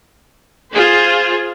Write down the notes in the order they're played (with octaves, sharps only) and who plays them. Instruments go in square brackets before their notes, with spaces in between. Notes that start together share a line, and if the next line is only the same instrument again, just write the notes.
[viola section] F4 G#4 C5